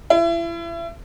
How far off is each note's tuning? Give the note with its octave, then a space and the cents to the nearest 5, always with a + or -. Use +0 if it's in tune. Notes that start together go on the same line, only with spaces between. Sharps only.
E4 +35